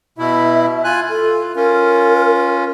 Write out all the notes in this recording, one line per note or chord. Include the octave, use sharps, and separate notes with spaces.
B2 E4 E5
F4 G#5 F#6
F4 A4
C#4 F4 A#4